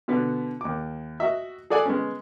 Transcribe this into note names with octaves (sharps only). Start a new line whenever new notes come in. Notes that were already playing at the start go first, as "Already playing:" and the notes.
B2 D3 B3
D#2 D6
F#4 D#5 E5
G#4 A4 D5 F#5 G#5
G#3 B3 C#4